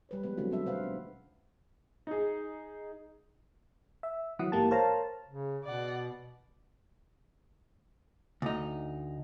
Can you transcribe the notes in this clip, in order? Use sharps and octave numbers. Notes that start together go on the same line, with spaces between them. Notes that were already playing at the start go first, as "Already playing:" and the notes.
G3 B4 C#5
F3 G#3 B3 B4
D3 F#3 A3 C4 F4 F#4
G3 C4 D4 E5
B2 B4 C5 F5 F#5
C#4
D#4 G#4
E5
D#3 E3 F#3 E4 F#5 D#6
G1 G#2 E3 A#3 G4 A5
A#4 C5 C#5 F5 A5 A#5
C#3
B2 D5 F#5
D2 D#4